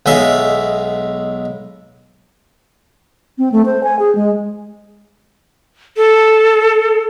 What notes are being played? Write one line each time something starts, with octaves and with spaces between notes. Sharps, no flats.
B1 G#3 E5 F5
C4
A3
C5
G#5
G#4
G#3
A4